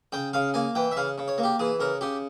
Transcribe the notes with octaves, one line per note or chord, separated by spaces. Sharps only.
C#3 G5
C#3 F5
A#3 G#5
E3 G5
E5
C#3 F5
C#3
C#5
A#3
G4
E3 G#4
C#3 A#4
C#3 G4